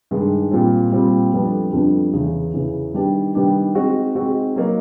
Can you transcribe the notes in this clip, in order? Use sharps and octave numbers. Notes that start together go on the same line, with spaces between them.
G2 D#3 G#3
A#2 G3 C4
A#2 G3 C4
F2 D3 G3 B3 D4
F2 D3 G3 B3 D4
E2 C#3 E3
E2 C#3 E3
D#3 G3 B3 D4 G4
D#3 G3 B3 D4 G4
G#3 C4 D#4 F#4
G#3 C4 D#4 F#4
F#3 A#3 D#4